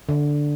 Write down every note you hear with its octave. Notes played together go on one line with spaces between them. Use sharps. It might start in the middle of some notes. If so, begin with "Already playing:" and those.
D3